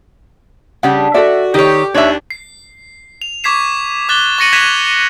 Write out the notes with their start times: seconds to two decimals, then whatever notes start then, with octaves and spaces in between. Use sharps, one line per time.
0.83 C#3 G3 D4 F#5
1.14 F#4 A4 D5 E5
1.54 D#3 G4 C#5
1.94 D#2 D4 C#5 E5
2.30 C7
3.22 F7
3.44 C#6 D6 G#6 B6 C7 E7
4.09 D6 F#6 A6 G7
4.38 C#6 A6 A#6 C#7 D#7 F#7
4.53 F#6 G#6 A6 B6 E7 F7